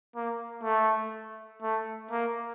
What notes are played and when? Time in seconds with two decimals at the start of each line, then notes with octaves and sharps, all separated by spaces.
0.15 A#3
0.63 A3
1.62 A3
2.11 A#3